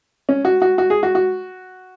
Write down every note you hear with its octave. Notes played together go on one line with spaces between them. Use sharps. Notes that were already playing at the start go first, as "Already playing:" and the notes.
C#4
F#4
F#4
F#4
G#4
F#4
F#4